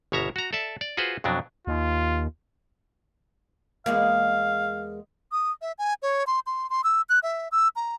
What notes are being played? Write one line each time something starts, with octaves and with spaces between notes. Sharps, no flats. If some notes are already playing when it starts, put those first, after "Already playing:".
G1 B2 C#5 E5 A#5
F#4 A#5
A4 D5 E5 A5
D5
F4 F#4 G#4 B4 C5
F2 B2 F#3 D4
D#2 F4
E2 G#3 A#3 F5
D#6
E5
G#5
C#5
C6
C6
C6
E6
F#6
E5
E6
A#5